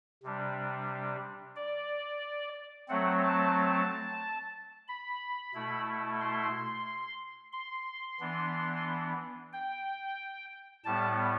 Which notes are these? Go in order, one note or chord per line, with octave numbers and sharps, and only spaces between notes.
C3 G3 D4
D5
F#3 A3 C4 F#5
A5
B5
B2 A3 E4
C6
C6
E3 B3 D4
G5
A2 G3 B3 A5